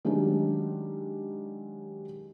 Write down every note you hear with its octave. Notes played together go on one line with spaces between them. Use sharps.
D#3 F#3 G#3 C#4 D4 G4